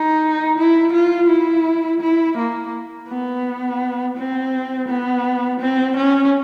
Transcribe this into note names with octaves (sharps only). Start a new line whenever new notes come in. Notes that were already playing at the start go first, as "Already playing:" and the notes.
Already playing: D#4
E4
F4
E4
E4
A#3
B3
C4
B3
C4
C#4